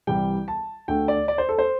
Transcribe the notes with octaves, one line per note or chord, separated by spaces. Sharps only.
C2 C3 E3 G3 G5
A5
D2 D3 A3 G5
D5
D5
C5
A4
C5